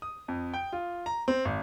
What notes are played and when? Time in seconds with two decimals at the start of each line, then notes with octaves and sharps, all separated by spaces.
0.02 D#6
0.28 F2
0.54 G5
0.73 F4
1.06 A#5
1.28 C4
1.45 G#1